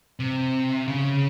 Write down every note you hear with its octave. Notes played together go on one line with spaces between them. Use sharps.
C3
C#3